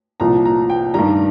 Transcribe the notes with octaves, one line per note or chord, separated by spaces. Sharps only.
C2 A#2 F3 A#5
A#5
G5
G2 D#3 G3 A#5